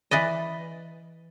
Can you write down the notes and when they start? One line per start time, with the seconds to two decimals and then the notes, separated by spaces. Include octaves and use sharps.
0.11 E3 B4 D5 D#5